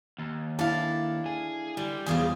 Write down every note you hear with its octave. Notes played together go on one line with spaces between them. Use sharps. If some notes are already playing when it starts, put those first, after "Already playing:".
D#2
D4 E4 A4 F5 A5
G#4
D3 G3
E2 C#3 F3 B3 F4 G#4